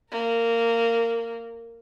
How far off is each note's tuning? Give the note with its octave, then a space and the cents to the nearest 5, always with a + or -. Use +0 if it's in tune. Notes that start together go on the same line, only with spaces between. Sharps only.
A#3 -15 A#4 -20